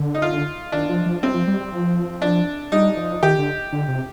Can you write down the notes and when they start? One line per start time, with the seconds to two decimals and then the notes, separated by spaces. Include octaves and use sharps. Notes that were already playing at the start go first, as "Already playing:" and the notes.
Already playing: D3
0.14 D#4
0.22 F4
0.72 D#3 D4
0.89 F3
1.06 F3
1.22 G3 C4
1.34 F3
1.47 G3
1.60 G3
1.72 F3
2.22 D4
2.72 G3 D#4
2.97 F3
3.23 D#3 G4
3.38 D3
3.73 D3
3.88 C3